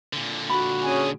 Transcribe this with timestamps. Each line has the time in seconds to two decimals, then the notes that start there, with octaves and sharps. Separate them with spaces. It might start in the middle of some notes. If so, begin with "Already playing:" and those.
0.13 A#2 D3
0.50 F#4 B5
0.84 C#4 G#4 G#5